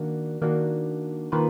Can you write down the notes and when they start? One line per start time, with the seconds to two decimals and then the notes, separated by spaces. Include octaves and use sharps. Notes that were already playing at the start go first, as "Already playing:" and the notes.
Already playing: D#3 A#3 D4 F#4
0.41 D#3 A#3 D4 F#4
1.32 D#3 A#3 F4 B4